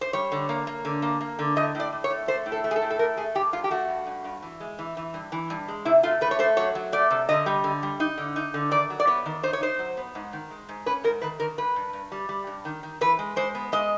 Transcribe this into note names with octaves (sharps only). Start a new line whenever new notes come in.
C5
G3 C#5
D3
A#3
A#3
D3
A#3
A#3
D3
A2 D#5
A2 D5
A2
C#5
A3
A3 C5
A2
A4
A3
G#4
A4
A2
A4
A3 A#4
A3 G#4
G2 G4
G2 F4
G4
A3 F#4
G2
G2
G2
E3
G#3
E3
E3
G2
E3
G2
G#3
C3 E4
A3 F4
A3 B4
C#5
A3 C5
F#3 C#5
F#3
A3 D5
C3
D3 D#5
G3
D3
G3
D#4
D3
D#4
D3
D#3 D5
F#3
D5
B3 C#5
D#3
D#4 C5
C#5
D#4 C5
F#3
B3
G#2
D#3
G#3
G#2
C#4 B4
G#2 A#4
D#3 B4
D#3 A#4
G2 B4
G2
G2
G3
G3
G2
D#3
D#3
E3 B4
G#3
G#3 C5
B3
G#3 D#5